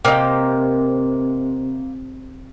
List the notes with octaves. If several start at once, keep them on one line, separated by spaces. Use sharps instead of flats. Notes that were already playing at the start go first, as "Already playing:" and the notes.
C3 A#3 D#4 G4